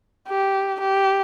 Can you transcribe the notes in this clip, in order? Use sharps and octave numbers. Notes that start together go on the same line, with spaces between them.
G4
G4